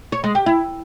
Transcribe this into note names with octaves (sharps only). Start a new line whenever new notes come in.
C#5
G#3
G4
E4